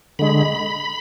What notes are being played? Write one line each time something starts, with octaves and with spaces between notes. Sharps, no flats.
D3 G#3 B5